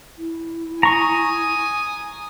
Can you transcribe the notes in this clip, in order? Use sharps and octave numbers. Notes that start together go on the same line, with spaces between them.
E4
G#5 A#5 C#6 D#6